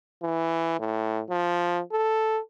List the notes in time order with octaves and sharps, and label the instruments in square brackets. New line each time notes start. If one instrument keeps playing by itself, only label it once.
[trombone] E3
A2
F3
A4